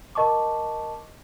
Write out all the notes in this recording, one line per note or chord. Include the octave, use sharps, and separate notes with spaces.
A#4 D#5 A5 C#6 D6